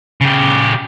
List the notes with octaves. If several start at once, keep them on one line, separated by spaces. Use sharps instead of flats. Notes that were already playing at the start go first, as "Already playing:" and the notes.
C#3 G4